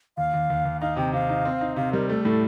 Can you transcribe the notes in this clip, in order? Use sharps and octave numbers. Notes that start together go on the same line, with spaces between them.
D#2 F5
D#2
D#2
D#2
D#4 F5
C3 G5
C3 F5
D#4
C4
D#4
C3 F5
G3 A#4
A3 A4
A2 A4